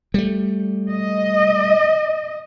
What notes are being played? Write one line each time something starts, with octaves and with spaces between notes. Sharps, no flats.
G3 A3
D#5